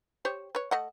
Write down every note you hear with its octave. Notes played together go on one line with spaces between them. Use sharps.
G4 C5 C#5
B4 C#5
A3 D#5 F#5